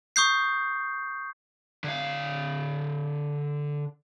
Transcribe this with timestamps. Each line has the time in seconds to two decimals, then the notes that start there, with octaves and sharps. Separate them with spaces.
0.16 C#6 D#6 G6 C7
1.84 D3 F5